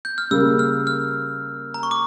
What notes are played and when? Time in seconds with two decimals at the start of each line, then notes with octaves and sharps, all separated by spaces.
0.05 G6
0.18 F6
0.31 C#3 G3 A#3 E6
0.59 F6
0.87 F6
1.74 A#5
1.83 C#6
1.91 D6